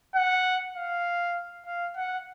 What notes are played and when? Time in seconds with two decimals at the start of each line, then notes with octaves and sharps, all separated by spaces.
0.15 F#5
0.75 F5
1.66 F5
1.97 F#5